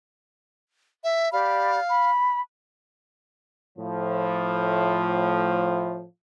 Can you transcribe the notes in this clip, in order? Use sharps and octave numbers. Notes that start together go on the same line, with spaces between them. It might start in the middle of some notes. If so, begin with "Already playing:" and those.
E5
G4 D5 F5 B5
B5
A2 F3